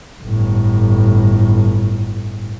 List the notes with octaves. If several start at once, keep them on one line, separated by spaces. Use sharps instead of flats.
G1 A2